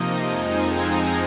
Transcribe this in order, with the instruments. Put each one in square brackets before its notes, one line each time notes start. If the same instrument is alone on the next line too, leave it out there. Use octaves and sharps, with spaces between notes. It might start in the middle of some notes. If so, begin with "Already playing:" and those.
Already playing: [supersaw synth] C3 F3 A#3 D#4 D#5
F2 F3 G#3 C4 D#4 G#5
A#5